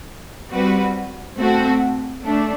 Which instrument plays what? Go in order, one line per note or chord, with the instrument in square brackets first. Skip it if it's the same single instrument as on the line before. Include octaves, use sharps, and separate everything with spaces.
[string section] G3 C4 F#4 B4
A3 C4 F#4 A4
A3 D4